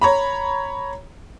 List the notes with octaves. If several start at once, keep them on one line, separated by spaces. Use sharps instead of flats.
C#5 A#5 B5